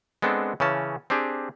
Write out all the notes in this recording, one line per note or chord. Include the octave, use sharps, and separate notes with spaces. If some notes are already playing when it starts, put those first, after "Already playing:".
G#3 B3 C4 D4 A4
C#3 E3 C#4 A5
C4 D4 G4 G#4